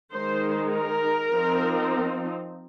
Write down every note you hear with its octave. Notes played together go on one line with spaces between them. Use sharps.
D#3 G#3 D#4 C5
A#4
F3 C4 D#4